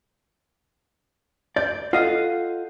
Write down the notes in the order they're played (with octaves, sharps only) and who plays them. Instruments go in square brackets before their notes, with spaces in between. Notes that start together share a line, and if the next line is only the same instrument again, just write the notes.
[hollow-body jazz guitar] D5 [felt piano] G6
[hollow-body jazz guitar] F4 D#5 F5 [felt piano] A4 F#5